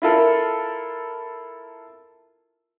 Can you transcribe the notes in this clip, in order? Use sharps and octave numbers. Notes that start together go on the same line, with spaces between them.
E4 F4 A4 A#4